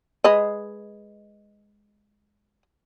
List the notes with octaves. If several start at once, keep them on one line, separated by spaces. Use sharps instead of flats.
G#3 B4 D#5